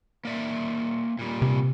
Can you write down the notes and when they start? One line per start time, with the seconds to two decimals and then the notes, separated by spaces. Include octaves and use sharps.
0.25 A#3 D5 E5
1.19 A#2 G3
1.42 C3